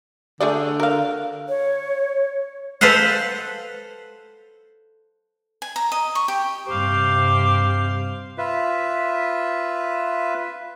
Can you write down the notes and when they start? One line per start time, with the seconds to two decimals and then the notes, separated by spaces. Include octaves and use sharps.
0.40 D3 A3 G#4 D5
0.80 A#4 F5
1.49 C#5
2.81 A4 B4 C5 F5 F#5
5.62 G#5
5.76 A#5
5.92 D#5
6.15 C#6
6.28 G4
6.67 G2 C3 G4 C5 F5
8.38 F4 B4 E5